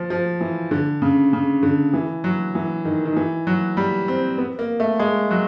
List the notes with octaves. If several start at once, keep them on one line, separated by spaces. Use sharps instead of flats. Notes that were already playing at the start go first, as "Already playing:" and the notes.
Already playing: F3
F3
E3
D3
C#3
C#3
D3
E3
F#3
E3
D#3
D#3
E3
F#3
G3
C4
B3
A#3
A3
G#3
F#3